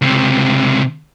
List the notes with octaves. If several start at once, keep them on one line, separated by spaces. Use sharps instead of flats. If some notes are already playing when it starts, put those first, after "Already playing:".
C#2 C3